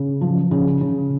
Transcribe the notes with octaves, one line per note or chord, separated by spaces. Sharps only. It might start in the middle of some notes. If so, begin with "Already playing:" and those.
Already playing: C#3
F3
C#3
C#3